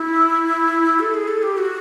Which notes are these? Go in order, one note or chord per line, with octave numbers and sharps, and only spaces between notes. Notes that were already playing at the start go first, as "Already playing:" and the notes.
Already playing: E4
A4
G#4
A4
G4
F#4